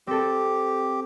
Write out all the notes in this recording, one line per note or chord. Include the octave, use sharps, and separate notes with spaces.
C4 G4 A4